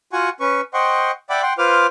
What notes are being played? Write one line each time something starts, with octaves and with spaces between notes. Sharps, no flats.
F4 F#4 F#5 G#5 C#6
C#4 B4 C#6
C5 D#5 F#5 G5 C6 C#6
D5 E5 F#5 G5 B5 D6
F#5 G5 C6
F4 B4 C5 D6 F6